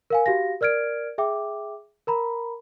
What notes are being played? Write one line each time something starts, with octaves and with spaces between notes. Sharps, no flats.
A#4 F5 G#5
F#4 G4 F5 A#6
A#4 D5 F6 G#6 D7
G#4 E5 G5 D6
A#4 A#5 B5